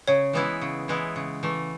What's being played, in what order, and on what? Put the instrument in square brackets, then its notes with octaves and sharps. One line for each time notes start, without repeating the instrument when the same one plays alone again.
[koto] C#3 [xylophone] C#5
[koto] E3 G#3 B3 E4
C#3
E3 G#3 B3 E4
C#3
E3 A3